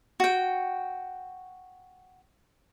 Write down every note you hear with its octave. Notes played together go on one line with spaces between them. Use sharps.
F#4 G5